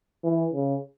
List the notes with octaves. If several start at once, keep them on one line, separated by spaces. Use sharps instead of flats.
E3
C#3